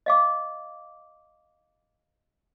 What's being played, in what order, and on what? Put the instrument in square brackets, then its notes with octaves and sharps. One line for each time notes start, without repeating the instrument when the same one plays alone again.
[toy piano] D#5 F5 D6